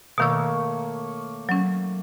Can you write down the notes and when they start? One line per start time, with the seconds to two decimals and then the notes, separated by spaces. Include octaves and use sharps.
0.18 B2 D#3 A3 A#3 C#5 E6
1.49 F#3 C#4